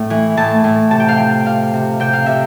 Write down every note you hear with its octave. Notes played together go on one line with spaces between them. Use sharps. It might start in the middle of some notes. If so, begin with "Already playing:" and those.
Already playing: A2
E3
A2 A5
A2
C3 A5
G5
F5
F3 G5
C3 F5
C3
C3 G5
F5
C3 E5